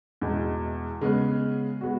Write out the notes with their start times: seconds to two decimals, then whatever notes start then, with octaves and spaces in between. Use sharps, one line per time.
0.21 E2 B2 G#3
1.01 C#3 G#3 B3
1.81 G#3 B3 F#4